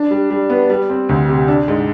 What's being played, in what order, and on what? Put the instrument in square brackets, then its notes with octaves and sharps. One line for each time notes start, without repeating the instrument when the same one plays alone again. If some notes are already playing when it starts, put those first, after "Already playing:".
Already playing: [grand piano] D4
G3
G3
B3
G3
C4
D2
C3
D4
G#2